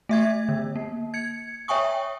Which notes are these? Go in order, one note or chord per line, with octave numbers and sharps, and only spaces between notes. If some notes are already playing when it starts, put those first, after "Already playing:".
A3 E5 G#6
D3
A#3
G#6 C#7
C#5 E5 G5 G#5 C#6 D#6